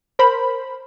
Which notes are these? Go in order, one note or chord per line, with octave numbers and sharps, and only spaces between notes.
A#4 C5 B5